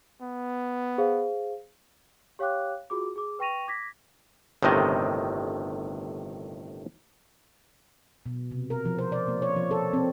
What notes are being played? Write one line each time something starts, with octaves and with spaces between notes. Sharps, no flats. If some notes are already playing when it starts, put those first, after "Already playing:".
B3
G#4 C5 F5
G4 C#5 F5 G5 D6 F#6
F4 F#4 G#4 D6
G#4 D6
B4 G5 C#6 A#6 D#7 F7
D6 G#6 A#6 B6
G1 A2 C3 D#3 D#5
B2
C3
A#4
F3
C5
D5
A#3
C#5
F3
A4
C4